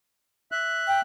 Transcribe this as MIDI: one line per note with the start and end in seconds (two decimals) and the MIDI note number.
0.52 1.01 76
0.52 1.01 90
0.88 1.00 79